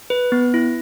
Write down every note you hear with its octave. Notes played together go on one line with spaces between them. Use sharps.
B4
B3
E4